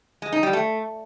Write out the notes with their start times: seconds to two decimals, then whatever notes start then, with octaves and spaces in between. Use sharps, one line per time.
0.22 G#3
0.32 D#4
0.43 G3
0.53 A3